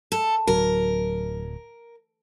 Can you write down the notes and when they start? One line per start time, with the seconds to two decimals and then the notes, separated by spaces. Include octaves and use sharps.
0.12 A4
0.47 D1 F#3 A#4